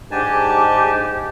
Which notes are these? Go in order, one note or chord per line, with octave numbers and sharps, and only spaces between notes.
G#2 D4 G4 G#5 A5